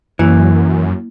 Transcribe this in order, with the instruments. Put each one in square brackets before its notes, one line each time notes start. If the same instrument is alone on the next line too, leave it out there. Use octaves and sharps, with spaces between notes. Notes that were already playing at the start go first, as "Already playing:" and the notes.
[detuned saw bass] F#2 [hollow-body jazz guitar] E3 [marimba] A#3 E4